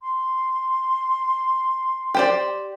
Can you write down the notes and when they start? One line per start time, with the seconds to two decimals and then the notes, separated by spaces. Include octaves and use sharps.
0.01 C6
2.14 G4 C5 D5